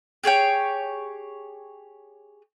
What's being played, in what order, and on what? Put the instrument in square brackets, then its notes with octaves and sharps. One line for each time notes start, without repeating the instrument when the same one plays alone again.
[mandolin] G4 G#4 C#5 G5